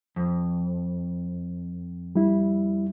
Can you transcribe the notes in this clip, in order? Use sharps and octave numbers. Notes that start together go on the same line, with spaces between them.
F2
G3 E4